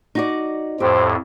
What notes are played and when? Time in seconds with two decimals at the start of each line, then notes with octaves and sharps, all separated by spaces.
0.15 D#4 F#4 D5
0.80 F2 A2 G4 C5